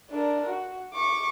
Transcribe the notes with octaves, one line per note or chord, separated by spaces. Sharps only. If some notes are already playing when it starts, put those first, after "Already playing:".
D4 A#4
F#4
C#6 D6